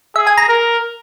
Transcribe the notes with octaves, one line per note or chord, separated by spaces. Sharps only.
G#4 E5
G#5
A#5
A#4